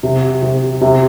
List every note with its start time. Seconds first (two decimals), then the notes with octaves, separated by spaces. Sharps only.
0.03 C3
0.42 C3
0.81 C3